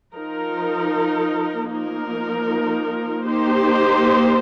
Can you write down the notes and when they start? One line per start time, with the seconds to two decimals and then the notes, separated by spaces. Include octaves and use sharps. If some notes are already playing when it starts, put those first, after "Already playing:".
0.15 F3 D#4 A#4
1.70 F3 A#3 D#4 A#4
3.25 A#3 D#4 G4 C5